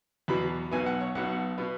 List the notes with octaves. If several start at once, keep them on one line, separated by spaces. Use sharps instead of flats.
E2 B2 F#3 B5
B1 B2 B3 G#5
F#5
C#5
B1 B2 B3 F#5
B2 B3